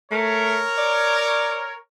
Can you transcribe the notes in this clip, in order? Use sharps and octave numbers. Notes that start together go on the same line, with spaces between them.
A3 A#4 C#5
D5